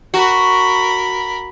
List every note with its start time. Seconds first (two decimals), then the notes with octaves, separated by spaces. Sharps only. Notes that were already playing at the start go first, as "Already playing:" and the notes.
0.14 F#4 A#4 B5